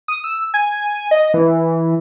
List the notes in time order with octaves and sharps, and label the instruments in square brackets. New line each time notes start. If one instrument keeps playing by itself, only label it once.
[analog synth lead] D#6
E6
G#5
D#5
E3